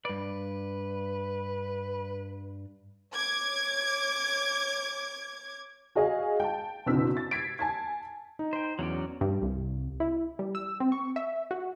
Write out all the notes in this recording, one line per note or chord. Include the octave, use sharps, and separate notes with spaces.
G2 B4 D5
C#5 D6 G#6
F#4 G#4 D#5 F5 G#5
G5 A5
F#1 B2 D3 C4 E6 B6
A6
G#6 A6 B6 C7 D7
G#5 A5 G#6
D#4
C5 G5
E2 F#3 C#4 D5
G2
C2
E4
G3
E6
C4
C#6
E5
F#4